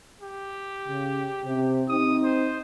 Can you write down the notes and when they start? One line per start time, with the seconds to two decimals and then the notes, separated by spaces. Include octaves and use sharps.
0.21 G4
0.87 C#3
1.44 C3
1.89 C4 D#4 D#6
2.24 C5